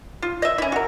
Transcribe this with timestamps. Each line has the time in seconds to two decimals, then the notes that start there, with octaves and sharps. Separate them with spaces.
0.22 F4
0.42 D#5 E5
0.58 C#4 E4
0.72 F#4 A#4